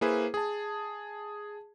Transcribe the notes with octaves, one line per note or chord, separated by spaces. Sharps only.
A#3 E4 G#4 B4 C5
G#4 A5